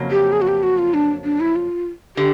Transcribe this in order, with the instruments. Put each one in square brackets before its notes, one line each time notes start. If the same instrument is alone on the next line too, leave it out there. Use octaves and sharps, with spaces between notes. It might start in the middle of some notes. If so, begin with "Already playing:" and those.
Already playing: [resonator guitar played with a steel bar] F2 C#3 F#3 A#3
[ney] G4
G#4
F#4
G4
F#4
F4
D4
D4
E4
F4
[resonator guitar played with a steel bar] D3 [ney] G4